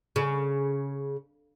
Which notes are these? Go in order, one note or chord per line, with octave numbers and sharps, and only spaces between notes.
C#3